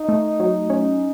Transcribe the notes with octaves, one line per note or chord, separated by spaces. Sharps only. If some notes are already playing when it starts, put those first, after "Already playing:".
Already playing: D#4
A3
F#3
C#4